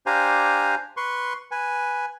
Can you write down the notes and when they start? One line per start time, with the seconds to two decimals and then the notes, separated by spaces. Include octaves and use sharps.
0.06 D4 G4 C5 F5 G#5 A#5
0.97 B4 C6 C#6
1.51 B4 G#5